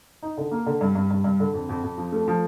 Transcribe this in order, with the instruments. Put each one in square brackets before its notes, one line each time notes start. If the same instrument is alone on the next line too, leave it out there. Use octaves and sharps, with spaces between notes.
[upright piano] D#4
D3
A#3
D3
G2
G2
G2
G2
D3
F2
F2
F2
F3
A3
F3